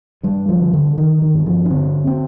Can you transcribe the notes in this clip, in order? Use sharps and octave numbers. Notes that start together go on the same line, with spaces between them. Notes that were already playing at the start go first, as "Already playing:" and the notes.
G2 G3
F3
D3
D3
D3 D#3
D#3
G2
F3
D4
D3 C4
C4